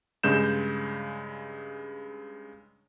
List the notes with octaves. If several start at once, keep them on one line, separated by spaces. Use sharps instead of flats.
G2 C#3 G#3 G6 E7